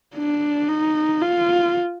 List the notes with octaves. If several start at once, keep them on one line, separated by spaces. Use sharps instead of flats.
D4
D#4
F4